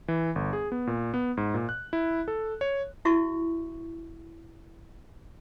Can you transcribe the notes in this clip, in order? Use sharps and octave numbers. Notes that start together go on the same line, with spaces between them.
E3
G1
G#4
B3
A#2
B3
G#2
A#2
F#6
E4
A4
C#5
E4 F#4 E5 C#6